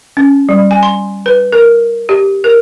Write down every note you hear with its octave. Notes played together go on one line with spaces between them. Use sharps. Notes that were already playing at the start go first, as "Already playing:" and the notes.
C#4
G3
G#5
C6
B4
A#4
G4
A#4